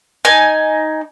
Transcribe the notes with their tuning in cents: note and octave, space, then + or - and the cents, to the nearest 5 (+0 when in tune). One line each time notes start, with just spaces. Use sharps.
D#4 +5 G#5 +5